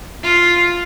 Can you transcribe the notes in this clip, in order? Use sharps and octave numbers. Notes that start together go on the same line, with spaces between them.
F4